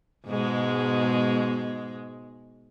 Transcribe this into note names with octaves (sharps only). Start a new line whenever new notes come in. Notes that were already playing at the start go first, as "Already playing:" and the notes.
G#2 B2 G#3